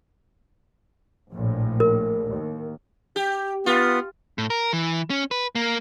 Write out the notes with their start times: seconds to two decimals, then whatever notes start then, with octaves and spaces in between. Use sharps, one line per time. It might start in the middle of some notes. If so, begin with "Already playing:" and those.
1.33 A#1 A2
1.80 A#4
2.30 D#2
3.16 G4
3.66 B3 F4
4.38 A2
4.50 A#4
4.73 E3
5.10 C#4
5.31 B4
5.55 A#3